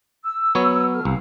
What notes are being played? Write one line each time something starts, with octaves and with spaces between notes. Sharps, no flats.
E6
F#3 B3 C#5
A4 F6
C2 F5